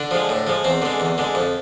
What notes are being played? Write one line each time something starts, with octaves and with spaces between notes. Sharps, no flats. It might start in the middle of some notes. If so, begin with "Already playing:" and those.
Already playing: D3 D4
F3 G#3
A2
F3 G#3
E2 C4
D3 G#3
E2
D3 G#3
F2